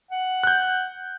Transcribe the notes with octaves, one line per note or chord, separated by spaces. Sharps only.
F#5
F#6 G6